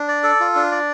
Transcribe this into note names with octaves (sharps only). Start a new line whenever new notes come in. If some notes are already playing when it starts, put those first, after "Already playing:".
Already playing: D4
D5
A4
F4
D4
D5